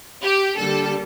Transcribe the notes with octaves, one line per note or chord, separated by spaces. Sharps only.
G4
D3 G3 A#3 A4